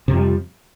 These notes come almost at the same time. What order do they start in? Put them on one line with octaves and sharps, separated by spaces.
C3 F2 F3 G3